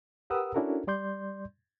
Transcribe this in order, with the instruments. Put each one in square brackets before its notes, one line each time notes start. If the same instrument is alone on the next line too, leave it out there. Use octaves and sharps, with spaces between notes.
[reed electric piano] G4 A#4 B4 F#5 D#6 E6
C#4 D4 E4 F#4 A4 A#4
G3 D5 C6 G6